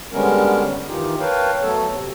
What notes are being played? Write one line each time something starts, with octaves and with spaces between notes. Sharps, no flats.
D3 G3 G#3 B3 C#4 A#4
D#3 E3 D#4 F4 G4
A#4 B4 C#5 F5 G5 A5
F#3 A3 B3 A4 C#5 A5
D2 C3